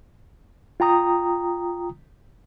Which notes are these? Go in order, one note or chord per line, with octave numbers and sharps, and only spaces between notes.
F4 G5 A#5 D#6